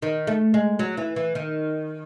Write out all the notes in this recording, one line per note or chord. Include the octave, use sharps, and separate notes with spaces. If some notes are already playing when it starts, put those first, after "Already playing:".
D#3
A3
G#3
F#3
E3
E3
D#3